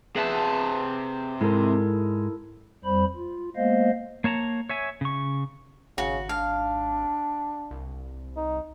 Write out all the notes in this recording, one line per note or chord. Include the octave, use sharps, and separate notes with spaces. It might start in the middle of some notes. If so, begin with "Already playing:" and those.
C3 G#4 B4 E5 A5
G#2 G#3 E4 A4 A#4
F2 G3 C5 B5
F4
G#3 A#3 B3 C5 D#5 F5
A#3 C#5 A5 A#5
C#5 E5 G#5
C#3 C#6
G#1 C#3 F#4
D4 F5
C2
D#4